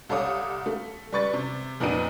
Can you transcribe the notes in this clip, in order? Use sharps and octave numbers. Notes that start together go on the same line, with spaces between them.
C2 A4 C#5 F5 D6 D#6
A3
G3 B4 C#6 A6
C3
F2 A#2 B3 D#4 D#7